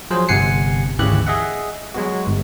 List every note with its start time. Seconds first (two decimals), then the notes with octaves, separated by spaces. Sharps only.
0.11 F3 F#3 G#4 C5
0.29 G1 C3 F#5 G#5 C7 C#7
0.99 G#1 D2 C#3 E3 G4 F#6
1.27 G#4 D#5 E5 F#5
1.94 F#3 G#3 B3 F#4
2.26 G1